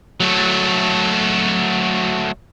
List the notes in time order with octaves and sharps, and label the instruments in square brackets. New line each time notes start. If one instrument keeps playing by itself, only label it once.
[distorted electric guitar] F#3 A3